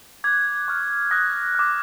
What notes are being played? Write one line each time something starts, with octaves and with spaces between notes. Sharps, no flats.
D6 F#6 G#6
C#6 F6
D#6 F#6 A#6
D6 F6